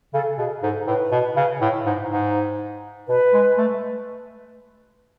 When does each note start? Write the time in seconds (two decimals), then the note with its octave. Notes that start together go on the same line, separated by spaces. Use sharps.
0.13 C#3 A4
0.38 B2 G#4
0.63 G#2 A4
0.87 A2 B4
1.11 B2
1.36 C#3
1.61 A2
1.86 G#2
2.10 G#2
3.08 B2 B4
3.33 G#3
3.58 A3